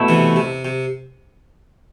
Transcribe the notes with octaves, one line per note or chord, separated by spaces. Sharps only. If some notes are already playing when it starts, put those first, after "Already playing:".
Already playing: B2 A3 E4
C3 E3
C3
C3